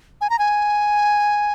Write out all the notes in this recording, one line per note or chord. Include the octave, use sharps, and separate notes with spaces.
G#5
A#5
G#5